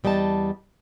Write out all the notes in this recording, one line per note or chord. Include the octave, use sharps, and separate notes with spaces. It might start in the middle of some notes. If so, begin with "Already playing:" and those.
E2 G3 D#5 G5 A5